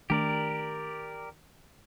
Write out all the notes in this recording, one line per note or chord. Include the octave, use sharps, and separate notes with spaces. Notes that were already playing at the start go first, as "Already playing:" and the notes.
D#3 A3 D4 G4 A#4 D5